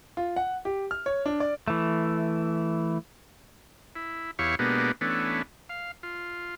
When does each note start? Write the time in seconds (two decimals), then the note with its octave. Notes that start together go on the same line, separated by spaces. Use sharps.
0.17 F4
0.36 F#5
0.65 G4
0.91 F6
1.06 C#5
1.26 D4
1.40 D5
1.68 E3 A3
3.96 E4
4.39 E2 E4 G4 C#5 F5 C#6
4.59 B2 G#3 A#3 B3 D4 G4
5.01 E3 A3 B3 C#4 D4
5.69 F5
6.03 F4